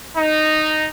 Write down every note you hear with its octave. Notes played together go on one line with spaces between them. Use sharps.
D#4